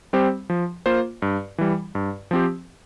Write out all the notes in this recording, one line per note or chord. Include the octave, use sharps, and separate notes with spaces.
G3 C4 G4 C5
F3
A#3 F4 C5
G2
E3 G3
G2
F3 C4 G4